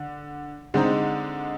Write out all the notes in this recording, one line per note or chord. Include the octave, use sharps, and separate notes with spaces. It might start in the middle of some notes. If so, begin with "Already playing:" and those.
Already playing: D3
D3 G#3 C4 D#4